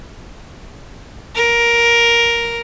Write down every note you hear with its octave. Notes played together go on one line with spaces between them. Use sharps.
A#4